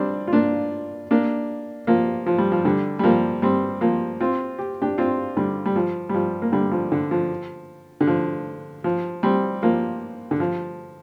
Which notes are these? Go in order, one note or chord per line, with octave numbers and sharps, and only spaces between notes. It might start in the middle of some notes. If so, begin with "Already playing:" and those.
Already playing: G3 C4 D4
F4
A#3 D4
A#3 D4
F3 A#3
F3
G3
F3
D3 G3
G3
F3 A#3
G3 C4
F3 A#3
C4 F4
G4
D4 G4
C4 F4
D3 G3
G3
F3
G3
F3
A#3
D3 G3
F3
D3
F3
D3
F3
F3
G3 C4
F3 A#3
D3
F3